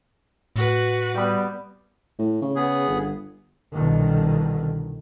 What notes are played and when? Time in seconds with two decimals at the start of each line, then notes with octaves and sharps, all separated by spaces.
0.56 A2 F#4 B4
1.15 G3 B3 G5
2.19 A2
2.41 C#3
2.55 B3 G#4
2.88 G1
3.73 C2 B2 D3 D#3